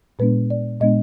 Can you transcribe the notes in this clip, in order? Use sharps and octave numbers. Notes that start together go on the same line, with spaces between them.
A#2 G#3 B3 D4 B4
D5
A#2 G#3 B3 D4 D#5